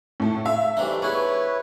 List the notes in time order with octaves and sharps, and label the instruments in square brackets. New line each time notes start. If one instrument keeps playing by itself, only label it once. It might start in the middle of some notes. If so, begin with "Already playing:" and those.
[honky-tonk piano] A2 A3
[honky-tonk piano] E5 [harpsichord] F5
[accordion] E3 A3 D4 [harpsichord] G3 C4 D#4
[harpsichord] B3 G#4 [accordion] E4 B4 C#5 [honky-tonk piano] C#6